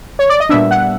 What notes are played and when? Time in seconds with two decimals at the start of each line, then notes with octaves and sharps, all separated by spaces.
0.19 C#5
0.30 D5
0.40 D#5
0.49 A#2 G3 B3 D4 E5
0.71 F#5